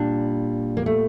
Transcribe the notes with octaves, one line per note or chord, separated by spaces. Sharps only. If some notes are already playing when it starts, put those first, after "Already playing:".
Already playing: A#2 G3 D4
A#3
A3